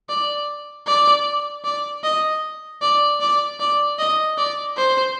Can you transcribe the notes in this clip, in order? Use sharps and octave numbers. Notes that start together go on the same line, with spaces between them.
D5
D5
D5
D#5
D5
D5
D5
D#5
D5
C5